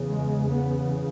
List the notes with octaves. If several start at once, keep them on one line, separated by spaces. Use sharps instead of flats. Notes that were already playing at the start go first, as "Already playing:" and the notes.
Already playing: E2 C#3
G#3
B3